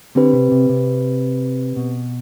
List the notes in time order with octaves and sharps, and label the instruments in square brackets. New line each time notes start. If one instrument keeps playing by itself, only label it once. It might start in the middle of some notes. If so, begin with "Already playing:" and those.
[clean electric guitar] D3 [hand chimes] C4 G4 B4
[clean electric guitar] C3
C3
C3
B2